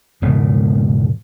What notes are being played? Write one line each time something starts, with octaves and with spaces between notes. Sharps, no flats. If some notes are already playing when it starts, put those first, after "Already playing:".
E1 G#2 C#3 B3